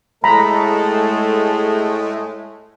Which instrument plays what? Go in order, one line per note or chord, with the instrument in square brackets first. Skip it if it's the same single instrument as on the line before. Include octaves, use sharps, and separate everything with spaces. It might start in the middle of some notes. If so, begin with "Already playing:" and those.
[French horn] A2 [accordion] G#3 A3 [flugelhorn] A4 [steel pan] A#5 B5